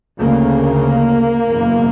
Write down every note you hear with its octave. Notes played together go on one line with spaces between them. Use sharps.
D2 C#3 A#3
F#1 E2 B2